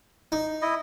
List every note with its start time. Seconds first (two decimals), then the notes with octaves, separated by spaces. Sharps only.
0.32 D#4
0.62 E4 D#5